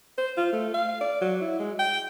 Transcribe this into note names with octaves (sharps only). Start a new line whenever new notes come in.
C5
F4
A3
F5
D5
F#3
E4
G#3
G5